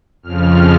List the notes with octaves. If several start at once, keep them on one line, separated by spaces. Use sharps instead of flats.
F2 C#3 F3 F6